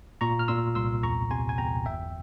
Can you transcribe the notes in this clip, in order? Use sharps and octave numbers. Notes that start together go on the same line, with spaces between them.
A#2 A#5 C#6
F6
A#2 C6 E6
C2 C6 E6
E2 A#5 C#6
C3 G#5 C6
G#5
E2 G5 A#5
G1 E5 G5